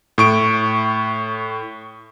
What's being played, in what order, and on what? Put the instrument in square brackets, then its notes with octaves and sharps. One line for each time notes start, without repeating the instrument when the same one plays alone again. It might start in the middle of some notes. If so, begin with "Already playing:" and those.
[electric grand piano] A2 C#6 D7